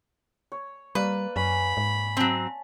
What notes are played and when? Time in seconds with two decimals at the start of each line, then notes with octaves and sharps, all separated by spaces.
0.52 C#5
0.95 G3 A#3 B4 D5
1.36 F#2 C#4 B5
1.77 G#2
2.17 F#3 C4 A5